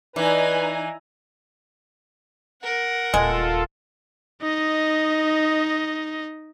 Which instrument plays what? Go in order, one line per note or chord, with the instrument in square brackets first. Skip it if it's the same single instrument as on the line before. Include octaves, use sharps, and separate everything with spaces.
[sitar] E3 [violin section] D#4 G#5 A#5 [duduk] B4 [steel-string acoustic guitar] D5
[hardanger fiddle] A#4 F#5
[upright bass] D#1 [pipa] G#3 [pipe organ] F4 A4
[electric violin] D#4 D#5